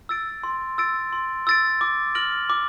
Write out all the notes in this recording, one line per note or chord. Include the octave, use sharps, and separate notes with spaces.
E6 A6 D7
C6
E6 A6 D7
C6
E6 A6 D7
D6
F6 A#6 D7 F#7
D6